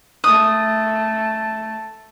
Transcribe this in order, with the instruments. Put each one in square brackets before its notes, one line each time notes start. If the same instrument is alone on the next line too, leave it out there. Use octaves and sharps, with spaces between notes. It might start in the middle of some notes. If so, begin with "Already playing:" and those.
[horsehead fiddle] A3 A5 [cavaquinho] D#6